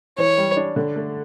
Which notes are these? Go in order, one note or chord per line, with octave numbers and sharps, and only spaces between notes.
E3 C#5
G3
D4
D3
A3